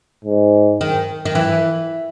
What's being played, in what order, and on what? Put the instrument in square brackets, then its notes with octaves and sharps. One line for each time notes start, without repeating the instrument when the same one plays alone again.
[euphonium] G#2
[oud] D#3
D#3
E3